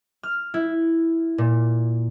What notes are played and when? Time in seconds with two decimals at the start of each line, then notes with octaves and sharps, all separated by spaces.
0.23 F6
0.54 E4
1.38 A#2